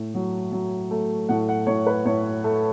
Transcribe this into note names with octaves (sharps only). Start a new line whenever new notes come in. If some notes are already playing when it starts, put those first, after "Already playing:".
Already playing: A2
F#3
F#3
A3
A2 F#5
F#5
A2 C#5
B4
A2 C#5
A3